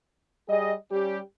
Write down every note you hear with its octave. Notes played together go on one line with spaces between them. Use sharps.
G3 G#4 D#5
G3 C#4 G4